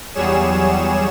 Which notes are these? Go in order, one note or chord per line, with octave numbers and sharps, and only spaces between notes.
E2 F#3 G3 G#4 C#5 E7